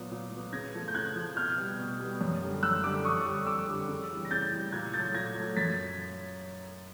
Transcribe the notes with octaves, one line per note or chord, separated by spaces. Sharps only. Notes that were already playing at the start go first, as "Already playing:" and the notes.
Already playing: A#2 F#3 B3
A#2
F#3 B3
C#3 G#6 A#6
F3 A3
G6
C#3 F#6 G#6
F3 A3
B2 F6 G6
G3 B3
B2
G3 B3
F#2
D3 G3
F#2 E6 F#6
D3 G3 D6 E6
F2 C#6 D#6
D3 G3
F2 D6 E6
D3 G3
C#3
E3 G3
A#6
C#3 G6 A6
E3 G3
A#2 F#6 G#6
F#3 A3 G6 A6
A#2 G#6 A#6
F#3 A3
F#2 A6 B6